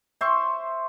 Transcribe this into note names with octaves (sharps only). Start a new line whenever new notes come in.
C5 E5 C6 C#6